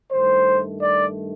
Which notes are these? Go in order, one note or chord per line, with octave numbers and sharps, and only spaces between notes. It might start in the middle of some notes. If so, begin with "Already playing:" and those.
G2 D#3 A3 C5
D5